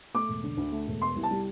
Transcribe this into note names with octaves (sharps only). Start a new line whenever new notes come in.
A3 D6
E1
D3
D2
A3
E1
B3 C6
C2
A5
G3